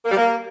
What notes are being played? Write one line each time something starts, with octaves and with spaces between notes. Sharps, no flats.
A#3
G3
A#3